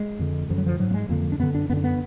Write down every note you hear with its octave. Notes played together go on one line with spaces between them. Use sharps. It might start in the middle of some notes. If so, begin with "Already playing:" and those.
Already playing: G#3
F2 D3
F#2 D3 F3
F#3
F3
G#2 F#3
A#3
G#3
F2 D3 A#3
D4
F#2 D3 B3
D4
F#2 D3 B3 D4
B3